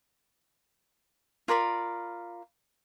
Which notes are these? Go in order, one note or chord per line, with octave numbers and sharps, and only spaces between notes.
F4 A#4 D5 B5